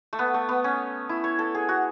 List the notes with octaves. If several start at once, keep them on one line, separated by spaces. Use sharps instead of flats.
A3
B3
A3
B3
C#4
E4
C#5
A4
G#4
F#4